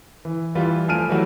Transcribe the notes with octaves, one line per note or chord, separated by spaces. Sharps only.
E3
E3 G3 F4
F3 A3 G#5 F6 D7 D#7
E3 F#3 G3 A3 F#4